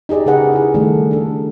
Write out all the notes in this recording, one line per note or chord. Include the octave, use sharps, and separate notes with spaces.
D#4 G4 G#4 D5 D#5
C#3 D#4 G#4 A#4 B4 F#5
E4 G#4
D#3 G3 A3 A4
D4 A4